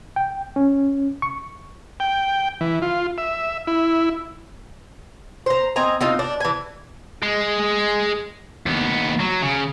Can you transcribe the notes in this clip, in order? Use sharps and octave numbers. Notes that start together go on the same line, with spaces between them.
G5
C#4
C#6
G5
E3
F4
E5
E4
C5 A#5
C4 D#5 G#5 A#5
C4 D#4 F4
D4
E3 G#5
G#3
D#2 B3
F#3
C#3